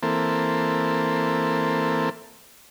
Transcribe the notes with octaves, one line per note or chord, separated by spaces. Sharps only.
E3 A#3 C4 A4